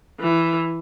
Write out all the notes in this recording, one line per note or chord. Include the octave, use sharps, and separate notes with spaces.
E3